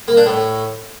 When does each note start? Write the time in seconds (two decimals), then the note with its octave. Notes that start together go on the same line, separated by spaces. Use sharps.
0.08 A#3
0.17 D4
0.26 A2